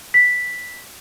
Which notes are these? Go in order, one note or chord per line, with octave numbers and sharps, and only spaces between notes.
B6